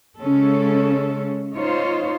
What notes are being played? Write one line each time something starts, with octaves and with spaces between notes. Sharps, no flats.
C#3 G#3 C#4 A4
D#4 F4 C5 C#5